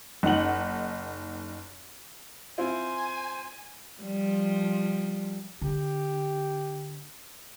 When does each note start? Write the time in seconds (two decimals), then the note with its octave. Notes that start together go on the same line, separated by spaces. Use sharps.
0.23 F#1 D#4 F#5 F#7
2.58 C4 E4 F4 C5 G#5
4.02 F3 G3
5.62 D3 G4